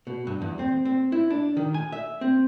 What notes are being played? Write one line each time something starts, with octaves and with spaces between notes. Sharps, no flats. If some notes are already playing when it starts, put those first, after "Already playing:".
B2
G2
E2
C4
C4
E4
D4
D#3
G#5
E5
C4